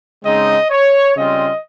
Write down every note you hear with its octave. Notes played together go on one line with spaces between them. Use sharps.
C#3 G#3 C4 D#4 D#5
C#5
C#3 G3 C4 F4 D#5